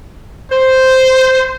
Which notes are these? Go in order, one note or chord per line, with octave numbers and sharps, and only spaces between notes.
C5